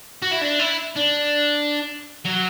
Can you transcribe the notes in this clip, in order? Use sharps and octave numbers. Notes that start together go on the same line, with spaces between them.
F#4
E4
D4
E4
D4
F#3